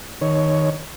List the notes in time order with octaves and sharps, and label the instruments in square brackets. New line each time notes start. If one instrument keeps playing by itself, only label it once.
[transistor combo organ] D#3 C#5